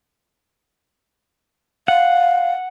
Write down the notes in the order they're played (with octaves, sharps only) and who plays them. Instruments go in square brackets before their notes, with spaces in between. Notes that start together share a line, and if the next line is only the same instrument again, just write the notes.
[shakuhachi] F5 [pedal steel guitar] F#5